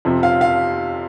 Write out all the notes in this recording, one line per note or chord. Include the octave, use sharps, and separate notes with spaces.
F2 C3 F3
F5
F5